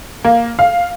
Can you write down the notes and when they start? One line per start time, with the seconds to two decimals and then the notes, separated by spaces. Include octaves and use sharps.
0.24 A#3
0.59 F5